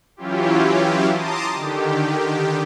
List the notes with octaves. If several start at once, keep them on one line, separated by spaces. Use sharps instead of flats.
E3 F#3 C#4 E4 F4 G4
A5 A#5 C6 D6 D#6
D3 D#3 G4